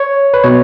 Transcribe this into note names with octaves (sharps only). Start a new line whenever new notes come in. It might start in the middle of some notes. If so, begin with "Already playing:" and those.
Already playing: C#5
B4
B2 C#5